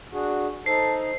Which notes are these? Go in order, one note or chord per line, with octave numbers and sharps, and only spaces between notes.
D4 F#4 G#4
D#4 A4 C5 C7